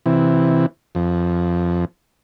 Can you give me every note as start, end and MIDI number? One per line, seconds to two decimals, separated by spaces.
0.06 0.66 48
0.06 0.66 52
0.95 1.85 41